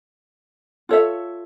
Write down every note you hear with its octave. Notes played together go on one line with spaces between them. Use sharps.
F4 A4 C#5 E5